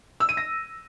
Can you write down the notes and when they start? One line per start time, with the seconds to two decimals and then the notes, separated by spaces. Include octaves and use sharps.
0.20 E6
0.29 D#7
0.37 A#6